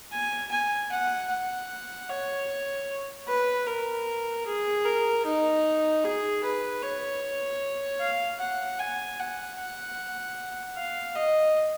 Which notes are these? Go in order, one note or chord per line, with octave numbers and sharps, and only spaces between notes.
G#5
G#5
F#5
F#5
C#5
B4
A#4
G#4
A#4
D#4
G#4
B4
C#5
F5
F#5
G#5
F#5
F#5
F5
D#5